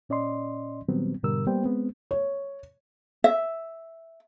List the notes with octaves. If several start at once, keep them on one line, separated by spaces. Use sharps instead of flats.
A#2 C#4 D5 D#5 C6
A#2 D#3 F#3 G3 B3 C4
G#2 B2 D3 G3 A#4 E6
G3 A#3 B3 C5 G5
G#3 B3 C4
C#5
E5